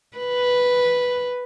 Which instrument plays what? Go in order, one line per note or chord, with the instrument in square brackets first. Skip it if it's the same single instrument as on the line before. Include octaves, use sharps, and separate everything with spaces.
[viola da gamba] B4